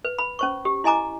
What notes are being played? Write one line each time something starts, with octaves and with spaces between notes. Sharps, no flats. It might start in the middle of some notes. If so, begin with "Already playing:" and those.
B4
B5
C#4 C5 C#6
G4
E4 D#5 G#5 A#5 D6